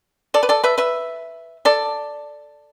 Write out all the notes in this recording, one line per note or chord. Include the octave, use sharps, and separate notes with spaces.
A4 D5
B4
A4 D5
B4 E5
B4 E5
A4 D5